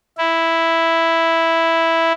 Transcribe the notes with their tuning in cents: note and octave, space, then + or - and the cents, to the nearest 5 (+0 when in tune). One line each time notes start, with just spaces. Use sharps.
E4 +0